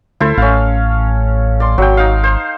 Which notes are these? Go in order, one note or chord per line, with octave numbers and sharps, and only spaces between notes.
D2 E4 A4 C5
A1 C#4 F5
D5 C6
G#1 F#3 G5
D#4 F5
C5